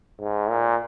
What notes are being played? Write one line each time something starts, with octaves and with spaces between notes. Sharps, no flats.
G#2
A#2